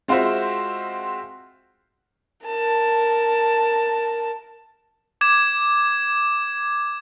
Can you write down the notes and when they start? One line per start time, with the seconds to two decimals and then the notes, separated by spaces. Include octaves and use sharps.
0.08 G#3 C4 F4 F#4 C5 E5
2.46 A#4 A5
5.21 D6 G#6 E7